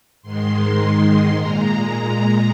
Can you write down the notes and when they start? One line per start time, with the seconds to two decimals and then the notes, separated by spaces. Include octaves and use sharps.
0.22 G#2 D#3 G#3 C6
1.34 A#2 G#3 A#5